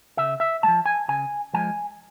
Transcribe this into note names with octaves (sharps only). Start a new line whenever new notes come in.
C#3 E5
E5
F3 G#3 A5
G#5
C#3 G#5
F3 G#3 G#5